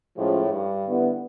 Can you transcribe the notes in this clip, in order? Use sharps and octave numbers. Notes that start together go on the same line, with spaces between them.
A2 F3 G#3 C#4 F4
G2
D3 G3 B3 E4